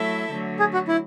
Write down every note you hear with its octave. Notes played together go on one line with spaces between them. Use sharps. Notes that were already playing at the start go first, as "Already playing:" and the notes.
Already playing: F#3 A3 E4 A4 E5
D3 F#3 A3
G#4
F#4
E4